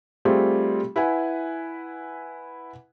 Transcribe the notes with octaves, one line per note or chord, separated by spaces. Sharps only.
G3 A3 C4 F4 G4 G#4
E4 B4 F#5 G#5